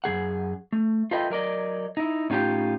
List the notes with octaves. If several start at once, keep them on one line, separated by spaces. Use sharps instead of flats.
F#2 F3 G#4 F#5
A3
F4 A4 B4 D#5 E5 G5
F#3 A#4 D5 D#5
D#4 E4
A2 C#4 D#4 F4 G4 G5